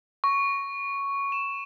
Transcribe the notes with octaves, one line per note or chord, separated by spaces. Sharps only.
C#6
E7